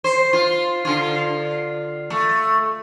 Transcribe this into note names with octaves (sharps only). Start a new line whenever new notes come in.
C5
F4
D3 F4
A3